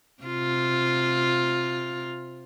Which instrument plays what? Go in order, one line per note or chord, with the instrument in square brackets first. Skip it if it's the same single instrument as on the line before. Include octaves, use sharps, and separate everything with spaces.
[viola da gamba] C3 F4